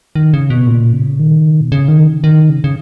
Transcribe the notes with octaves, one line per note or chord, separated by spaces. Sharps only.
D#3
C#3
B2
A#2
C#3
D#3
B2
C#3
D#3
D#3
C#3
C#3